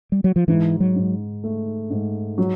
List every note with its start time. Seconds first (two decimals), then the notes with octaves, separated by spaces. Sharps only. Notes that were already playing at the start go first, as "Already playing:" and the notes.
0.12 G3
0.24 F#3
0.36 F3
0.48 G#2 E3
0.80 F#3
0.96 G#2
1.44 A3
1.90 G#2
2.38 F#3